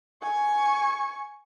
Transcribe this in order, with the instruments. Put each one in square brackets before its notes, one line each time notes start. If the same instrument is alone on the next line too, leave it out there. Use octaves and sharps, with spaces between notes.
[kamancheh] G#5 C#6